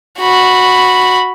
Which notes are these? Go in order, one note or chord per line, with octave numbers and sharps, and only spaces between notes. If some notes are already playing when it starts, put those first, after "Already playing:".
F#4 B5